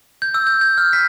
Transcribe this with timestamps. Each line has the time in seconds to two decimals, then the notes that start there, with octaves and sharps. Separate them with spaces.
0.22 G6
0.34 E6
0.47 G6
0.61 G6
0.78 F6
0.93 B6